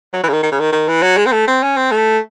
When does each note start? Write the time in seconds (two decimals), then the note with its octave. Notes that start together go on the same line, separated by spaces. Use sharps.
0.13 F#3
0.24 E3
0.29 C#3
0.33 D#3
0.43 D#3
0.52 C#3
0.60 D#3
0.72 D#3
0.88 E3
1.02 F#3
1.17 G#3
1.26 C4
1.32 A3
1.47 C4
1.63 C#4
1.77 C4
1.91 A3